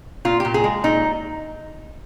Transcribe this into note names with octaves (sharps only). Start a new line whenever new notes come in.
A#2 F4
A#2 G4
G#4
G#3
A#2 D#4